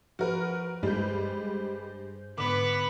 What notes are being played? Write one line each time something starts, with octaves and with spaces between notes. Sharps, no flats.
F3 F#4 A#4 B4
G2 G3 G#3 C5 G6
G#2 D3 B3 B4 D6